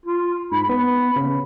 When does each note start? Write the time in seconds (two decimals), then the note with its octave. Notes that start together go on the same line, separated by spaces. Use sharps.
0.06 F4
0.52 G#2 B5
0.69 B3
1.16 C#3